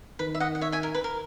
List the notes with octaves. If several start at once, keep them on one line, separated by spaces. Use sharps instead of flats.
D#3 B4
E5
D#5 F#5
F#5
C#5 E5
E5 G#5
A#4
B4
A#4